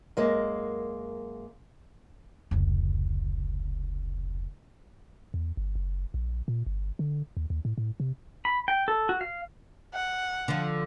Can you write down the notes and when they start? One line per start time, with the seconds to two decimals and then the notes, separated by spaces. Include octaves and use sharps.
0.17 F#2 G#3 A#3
2.51 F1 C#2
5.34 E2
5.57 G1
5.75 F#1
6.14 A#1
6.48 A#2
6.67 G1
6.99 D3
7.37 D#2
7.50 D#2
7.65 A2
7.78 A2
8.00 C3
8.45 B5
8.68 G5
8.88 A4
9.09 F#4
9.21 F5
9.94 F#5
10.48 D3 F3